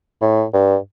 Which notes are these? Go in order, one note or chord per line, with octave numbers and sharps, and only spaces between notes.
A2
G2